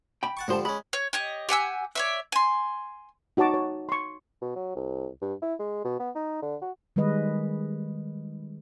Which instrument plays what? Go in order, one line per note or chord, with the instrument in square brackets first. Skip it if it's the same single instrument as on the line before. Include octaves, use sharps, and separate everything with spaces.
[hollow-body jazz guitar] G5 B5
[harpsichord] F#5 A5 C#6
[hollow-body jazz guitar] G#2 C5 A5 [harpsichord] D3 F3 G3
[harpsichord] G#3 C#4 [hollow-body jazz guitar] B5
[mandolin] C#5
G4 C#5 D#5
G4 F#5 G#5 E6
C#5 D5 E5
G#5 C6
[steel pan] D#4 F#4 C#5 A5 D6
C#5
C6 C#6
[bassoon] B2
F#3
C2
G2
E4
G#3
B2
B3
D#4
D3
F#4
[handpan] D#3 G3 G#3 B4 D#5